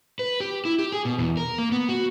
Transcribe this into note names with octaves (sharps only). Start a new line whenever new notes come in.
B4
G4
E4
G4
G#4
B2
E2
A#4
A#3
B3
F#4